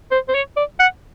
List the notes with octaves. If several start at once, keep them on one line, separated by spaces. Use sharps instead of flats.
C5
C5
C#5
D5
F#5